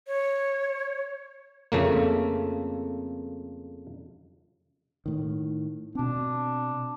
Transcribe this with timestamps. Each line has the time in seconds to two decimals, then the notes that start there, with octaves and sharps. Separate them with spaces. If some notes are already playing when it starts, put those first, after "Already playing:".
0.07 C#5
1.72 F2 C#3 A3 A#3
5.06 A2 D#3
5.95 B2 C4 D4